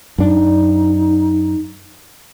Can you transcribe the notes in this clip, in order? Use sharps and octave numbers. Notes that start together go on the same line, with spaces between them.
F#2 D4 D#4